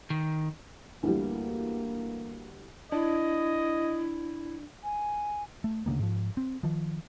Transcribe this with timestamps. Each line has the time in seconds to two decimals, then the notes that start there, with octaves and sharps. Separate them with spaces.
0.10 D#3
1.03 D2 E3 G3 A#3
2.92 D4 E4 D#5
4.83 G#5
5.64 A3
5.86 D2 C#3 G3 A#3
5.99 G#2 F3
6.37 C4
6.63 D#3 F3